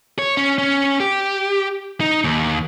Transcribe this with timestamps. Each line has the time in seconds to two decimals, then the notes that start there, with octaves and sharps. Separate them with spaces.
0.19 C#5
0.37 C#4
0.58 C#4
1.00 G4
2.00 D#4
2.25 D#2